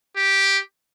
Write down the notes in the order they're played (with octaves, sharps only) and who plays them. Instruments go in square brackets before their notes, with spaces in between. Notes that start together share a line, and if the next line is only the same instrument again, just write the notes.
[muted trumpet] G4